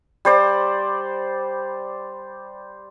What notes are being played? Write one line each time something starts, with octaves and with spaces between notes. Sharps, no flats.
G3 C5 D5